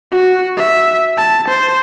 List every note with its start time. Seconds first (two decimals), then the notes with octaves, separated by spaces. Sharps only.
0.11 F#4
0.57 E5
1.17 A5
1.48 C5